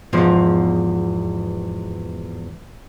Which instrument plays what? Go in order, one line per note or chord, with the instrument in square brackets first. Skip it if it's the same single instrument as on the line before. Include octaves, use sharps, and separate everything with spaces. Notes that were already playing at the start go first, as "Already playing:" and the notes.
[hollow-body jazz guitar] E2 G#2 B2 F3